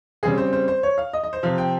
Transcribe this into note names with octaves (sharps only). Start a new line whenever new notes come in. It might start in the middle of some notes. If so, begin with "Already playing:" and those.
C#3 G3 C4 G#4
C5
C5
C5
C#5
F5
D#5
D#5
C5
C3 F3 C4 F5
G5